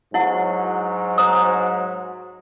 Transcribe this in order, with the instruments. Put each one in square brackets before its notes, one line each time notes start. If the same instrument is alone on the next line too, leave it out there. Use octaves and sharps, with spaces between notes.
[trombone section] G#2 F#3 [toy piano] E4 F#5
[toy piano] C5 A#5 D#6